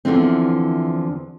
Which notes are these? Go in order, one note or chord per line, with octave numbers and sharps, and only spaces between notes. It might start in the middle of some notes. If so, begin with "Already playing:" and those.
E2 A#2 D3 E3 F3 C4